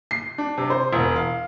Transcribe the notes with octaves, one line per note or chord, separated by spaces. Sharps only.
C7
D4
C3
C5
E1
F5